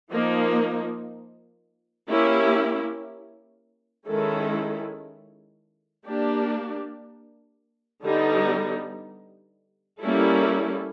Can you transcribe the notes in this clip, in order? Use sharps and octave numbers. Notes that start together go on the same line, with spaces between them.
F3 A#3 D#4
A#3 C#4 E4 G4
D#3 G#3 C#4 E4 A4
A#3 D4 G4
D3 G3 B3 D#4
G3 A#3 C#4 E4 A4